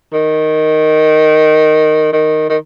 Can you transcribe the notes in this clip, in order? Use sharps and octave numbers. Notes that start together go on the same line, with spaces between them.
D#3
D#3
D#3